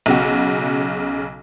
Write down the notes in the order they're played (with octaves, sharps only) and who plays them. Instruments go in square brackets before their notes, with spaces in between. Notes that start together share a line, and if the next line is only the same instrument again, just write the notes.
[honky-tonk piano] B1 C#3 F#4